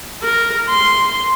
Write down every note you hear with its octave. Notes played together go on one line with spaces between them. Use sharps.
A#4
C6